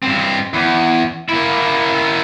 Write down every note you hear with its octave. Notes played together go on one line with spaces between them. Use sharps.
G2 C4
E2
A#3 E4